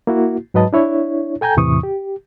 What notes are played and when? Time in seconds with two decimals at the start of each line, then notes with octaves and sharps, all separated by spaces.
0.07 A#3 E4 F#4
0.54 G#2 F#3 B4 D#5 A5
0.73 D4 E4 C#5
1.41 A4 G5 G#5 A#5 G6
1.56 E2 A2 C3 E3 C#6 D#6
1.83 G4